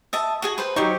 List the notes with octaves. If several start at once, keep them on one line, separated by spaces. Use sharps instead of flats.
D#5 E5 A5
F#4 G#4 G#5
B4 C5 G5
F#3 D#4 G4 C5 C#6